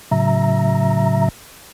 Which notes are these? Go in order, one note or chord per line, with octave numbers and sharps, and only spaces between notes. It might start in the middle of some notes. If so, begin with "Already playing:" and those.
A2 C#3 F#3 E5 A#5